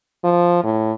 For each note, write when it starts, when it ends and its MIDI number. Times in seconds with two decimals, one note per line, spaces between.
0.24 0.62 53
0.64 0.92 45